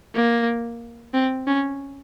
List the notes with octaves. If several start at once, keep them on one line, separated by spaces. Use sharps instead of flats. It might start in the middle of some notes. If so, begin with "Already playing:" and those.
A#3
C4
C#4